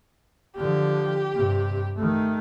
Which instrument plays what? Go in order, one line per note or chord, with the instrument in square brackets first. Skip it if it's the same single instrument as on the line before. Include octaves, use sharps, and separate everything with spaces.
[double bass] D3 F3 [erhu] G4
[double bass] G2 C3
D#3 A3